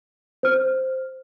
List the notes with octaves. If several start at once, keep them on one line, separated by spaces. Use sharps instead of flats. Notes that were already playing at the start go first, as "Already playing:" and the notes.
C5 F6